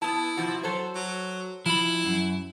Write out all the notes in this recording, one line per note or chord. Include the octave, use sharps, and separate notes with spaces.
B3 E4 A5
C3 F3 F#4
F#3 A4 C5
F#3
F3 E4 B5
F#2